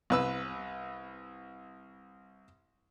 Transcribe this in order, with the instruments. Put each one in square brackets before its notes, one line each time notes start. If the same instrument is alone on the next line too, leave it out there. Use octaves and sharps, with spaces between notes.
[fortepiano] C2 B4 E6